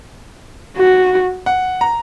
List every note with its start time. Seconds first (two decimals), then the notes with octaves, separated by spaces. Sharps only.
0.77 F#4
1.46 F#5
1.81 A#5